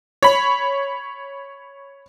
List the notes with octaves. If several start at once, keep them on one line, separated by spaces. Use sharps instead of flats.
C#5 B5